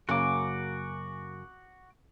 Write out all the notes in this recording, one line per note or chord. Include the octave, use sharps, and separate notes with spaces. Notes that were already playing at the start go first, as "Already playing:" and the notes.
F#2 C#3 A#3 F#4 D6